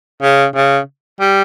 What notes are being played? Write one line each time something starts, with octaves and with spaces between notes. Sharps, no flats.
C#3
C#3
G3